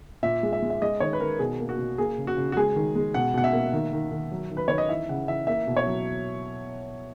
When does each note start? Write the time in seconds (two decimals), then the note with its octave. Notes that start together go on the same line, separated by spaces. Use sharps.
0.23 A#2 E5
0.43 G#3
0.53 E5
0.62 G#3
0.70 E5
0.82 G#3 D#5
1.00 D#3 C#5
1.13 B4
1.21 D#3 A#4
1.39 B2 G#4
1.60 A#3
1.69 F#4
1.78 B2
1.98 A#3 G#4
2.18 C#3
2.27 F#4
2.37 C#3
2.52 F#4
2.57 G#3 G#4
2.76 D#3
2.96 G#3
3.14 B2 F#5
3.34 B2 F#5
3.44 E5
3.53 A#3
3.73 D#3
3.93 D#3
4.11 D#3
4.31 F#3
4.50 D#3
4.57 B4
4.68 D#3 C#5
4.78 D#5
4.89 E3 E5
5.09 C#3 F#5
5.28 E3 E5
5.47 A#3 E5
5.67 B2
5.77 C#5
5.87 F#3